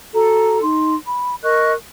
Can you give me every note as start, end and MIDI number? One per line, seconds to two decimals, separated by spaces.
0.13 0.61 66
0.13 0.61 69
0.13 0.61 82
0.61 0.94 63
0.61 0.94 84
1.06 1.34 83
1.43 1.72 70
1.43 1.72 75
1.43 1.72 85
1.43 1.72 90